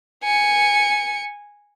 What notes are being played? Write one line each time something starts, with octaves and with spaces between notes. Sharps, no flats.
G#5 C#7